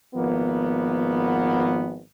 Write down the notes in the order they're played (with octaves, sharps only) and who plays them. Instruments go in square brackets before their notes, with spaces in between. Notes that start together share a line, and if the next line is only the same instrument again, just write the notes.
[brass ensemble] G#1 F3 A#3 B3